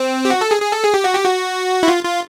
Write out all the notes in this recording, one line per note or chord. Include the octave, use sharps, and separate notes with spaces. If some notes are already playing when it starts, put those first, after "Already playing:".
Already playing: C4
G4
F#4
A4
G#4
G#4
A4
G#4
G4
F#4
G4
F#4
E4
F4
F4